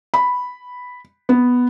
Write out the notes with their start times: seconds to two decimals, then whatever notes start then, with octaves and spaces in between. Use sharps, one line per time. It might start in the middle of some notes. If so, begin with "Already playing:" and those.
0.14 B5
1.29 B3